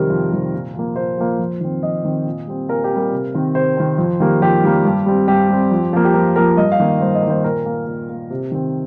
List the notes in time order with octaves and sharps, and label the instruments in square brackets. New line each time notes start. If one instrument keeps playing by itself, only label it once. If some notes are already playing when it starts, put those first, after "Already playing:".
Already playing: [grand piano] F2 C3 D#3 G3 A#4
F2
C3 D#3 G3
A#2
F3 A#3
A#2 C5
F3 A#3
F2
D#3 C4
F2 D#5
D#3 C4
A#2
G3 C4
A#2 A#4
G4
C4
G3 A#4
C3
D#3 C4
C3 C5
D#3 C4
F2
D#3 G3 A#3
F2 G4
D#3 G3 A#3
G2
G3 C4
G2 G4
G3 C4
F2
F3 A#3
G4
F2 A#4
F3 A#3 A#4
G2 D#5
F5
D#3 A#3
G2 C5
D#5
A#3
D#3 C5
A#2 A#4
A#3
A#2
A#3
C3
D#3 C4